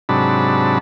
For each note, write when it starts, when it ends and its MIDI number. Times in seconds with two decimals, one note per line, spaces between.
0.09 0.78 44
0.09 0.78 48
0.09 0.78 54
0.09 0.78 62
0.09 0.78 81
0.09 0.78 83